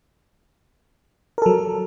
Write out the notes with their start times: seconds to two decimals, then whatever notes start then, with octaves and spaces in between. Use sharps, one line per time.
1.38 A#4
1.42 A4
1.46 F#3